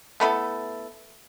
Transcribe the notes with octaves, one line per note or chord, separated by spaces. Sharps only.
A3 B3 E4 A4